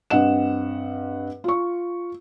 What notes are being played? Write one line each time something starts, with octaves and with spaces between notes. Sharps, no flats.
G2 C4 D#5 F#5 E7
F4 C#6